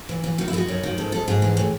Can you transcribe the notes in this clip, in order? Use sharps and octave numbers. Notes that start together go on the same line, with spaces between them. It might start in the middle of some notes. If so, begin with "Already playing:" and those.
E3
E3
D#3 F#4
E4
D#3 G#4
F#4
F#2
D#3
G#2 A4
G#2 A4
G#2 G#4
E3
A2